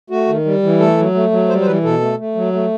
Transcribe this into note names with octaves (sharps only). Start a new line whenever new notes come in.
A3 F#4
D#3
G3
E3
A3 A4
F#3
A3
F#3
G3 C5
C5
E3 B4
B2 A4
A3
A3
F#3
A3